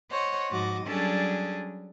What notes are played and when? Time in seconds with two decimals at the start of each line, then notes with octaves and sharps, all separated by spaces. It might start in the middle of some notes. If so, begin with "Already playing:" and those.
0.11 C5 C#5 D#5 F#5
0.50 G#2 F3 F#4 D#5 D6
0.86 F#3 G3 C#4 D4 G#4 A4